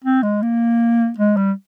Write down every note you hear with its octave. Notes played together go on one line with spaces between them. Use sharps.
C4
G#3
A#3
G#3
G3